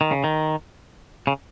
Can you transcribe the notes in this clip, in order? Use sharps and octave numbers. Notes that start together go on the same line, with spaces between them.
D#3
C#3
D#3
C#3